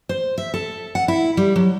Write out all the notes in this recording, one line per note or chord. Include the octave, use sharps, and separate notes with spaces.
C5
E5
A4
F#5
E4
G3
F#3